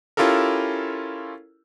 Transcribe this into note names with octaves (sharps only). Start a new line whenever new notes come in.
C#4 E4 F4 G4 A4 A#4